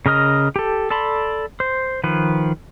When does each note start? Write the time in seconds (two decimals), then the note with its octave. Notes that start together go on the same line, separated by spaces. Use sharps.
0.06 C#3 A#4 D#5 F6
0.56 G4 A4
0.90 A4 D5 A5 B5 C6
1.60 C5
2.04 D#3 F3 B4